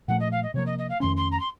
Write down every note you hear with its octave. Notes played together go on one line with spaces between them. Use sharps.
A#2 F3 A3 F#5
D#5
F5
D#5
C3 F3 A#3 C#5
D#5
D#5
F5
F2 D#3 A3 C#4 C6
C6
A#5
C6